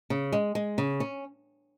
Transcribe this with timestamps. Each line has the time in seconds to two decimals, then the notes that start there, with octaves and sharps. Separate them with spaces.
0.10 C#3
0.32 G#3
0.55 G#3
0.78 C#3
1.00 C#4